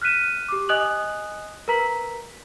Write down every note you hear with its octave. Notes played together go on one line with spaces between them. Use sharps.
F6 F#6 B6 D#7 E7
G4 D6
D#5 G#5 D#6 F#6 F7 F#7
A#4 B4 A#5 B6 F#7